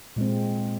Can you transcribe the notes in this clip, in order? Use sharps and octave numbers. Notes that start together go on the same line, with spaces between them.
A#2 G#3 C4